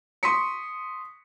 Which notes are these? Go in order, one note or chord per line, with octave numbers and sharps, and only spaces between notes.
C6 C#6 D#6 B6 C#7